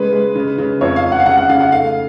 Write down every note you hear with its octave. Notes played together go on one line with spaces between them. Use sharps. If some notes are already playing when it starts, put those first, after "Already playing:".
Already playing: C#3 G#3 B4
G#3
C#3
C#3
F2 C#5
F5
F2
F#5
F5
C#3 F#5
F#5
C#3 F5
F#5
A3 F5